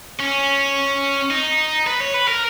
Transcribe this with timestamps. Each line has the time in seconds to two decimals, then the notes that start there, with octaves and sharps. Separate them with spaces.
0.20 C#4
1.31 D#4
1.87 B4
2.00 C#5
2.14 B4
2.28 A#4